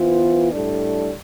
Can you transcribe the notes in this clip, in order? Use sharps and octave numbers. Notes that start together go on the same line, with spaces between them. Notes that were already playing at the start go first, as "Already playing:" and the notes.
Already playing: E3 B3 F4 C5
A2 G3 D4 A4 D5